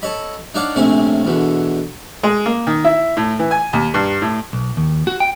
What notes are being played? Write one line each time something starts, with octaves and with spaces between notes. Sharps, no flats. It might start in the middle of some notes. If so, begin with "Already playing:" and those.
A4 C#5 D#5 B5
D4 D#4 C#5 D5 F5 F#5
A#1 C3 A3 C4 C#4 G#5
E2 B2 D3
G#3
A#3
D#3
E4
A2
E3
G#5
D#2
G2
A2
B1
D#2
F#4
G5